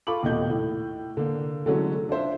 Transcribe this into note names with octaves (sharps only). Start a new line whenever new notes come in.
F4 A4 B5 C#6 D6 F#7
D#1 D#2 B2 A3 D#4 G6
A2
D3 A#3
D3 E3 F#3 G#3 A3 C#4
D4 F4 C5 E5